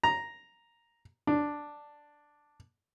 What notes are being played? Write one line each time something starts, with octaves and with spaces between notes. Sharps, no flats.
A#5
D4